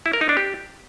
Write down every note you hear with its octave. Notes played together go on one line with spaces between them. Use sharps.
E4
A#4
D#4
D4
G4